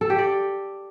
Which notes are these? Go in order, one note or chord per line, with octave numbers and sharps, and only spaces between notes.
A4
G4
D5